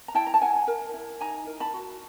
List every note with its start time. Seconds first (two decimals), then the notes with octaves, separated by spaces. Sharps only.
0.08 A#5
0.15 E4 G5 A5
0.27 A#5
0.34 A5
0.42 E4 F#5 G#5
0.68 A#4
0.94 E4
1.21 D#4 G#5 A#5
1.47 A#4
1.60 A5 B5
1.74 F#4